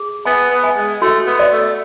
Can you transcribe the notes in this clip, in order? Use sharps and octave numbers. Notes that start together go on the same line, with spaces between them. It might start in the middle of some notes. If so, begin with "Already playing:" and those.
Already playing: G#4
B3 G#5
B3
G#5
G#3
A3 F#4
B3
D5
A3